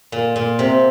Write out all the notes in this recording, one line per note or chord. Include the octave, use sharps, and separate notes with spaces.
A#2
A#2
C3